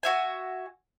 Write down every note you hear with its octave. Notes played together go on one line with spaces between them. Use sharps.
F#4 E5 G#5